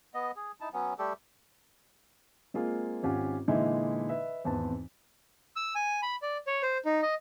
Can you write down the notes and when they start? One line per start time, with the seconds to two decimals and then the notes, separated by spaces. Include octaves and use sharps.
0.14 B3 D#5
0.36 G#4
0.61 D#4 E4 A5
0.73 F#3 B3 C#4
0.99 G3 A3 G4 A4
2.54 G#3 A#3 C4 F4 G#4
3.03 G#1 C#4 F4 G4 F#5 G#5
3.48 A#2 D3 E3 G#3 D#4 E4
4.09 B4 D#5 E5
4.44 G#1 E2 C4 B4 A5
5.56 E6
5.75 G#5
6.03 B5
6.22 D5
6.47 C#5
6.63 C5
6.85 D#4
7.02 D#5